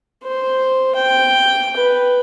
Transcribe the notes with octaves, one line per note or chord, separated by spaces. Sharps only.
C5
G5
B4